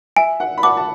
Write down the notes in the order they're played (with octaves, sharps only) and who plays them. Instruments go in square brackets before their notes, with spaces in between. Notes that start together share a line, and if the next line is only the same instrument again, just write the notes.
[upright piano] E5 [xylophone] G#5
[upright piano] F#5
B5
[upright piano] F#5 A5 [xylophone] D6
[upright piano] A5